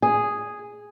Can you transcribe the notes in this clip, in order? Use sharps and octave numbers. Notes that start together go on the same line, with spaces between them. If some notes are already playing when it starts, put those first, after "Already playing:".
G#4